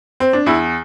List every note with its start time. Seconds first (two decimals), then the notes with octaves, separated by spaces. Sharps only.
0.20 C4
0.33 D4
0.46 E2 E4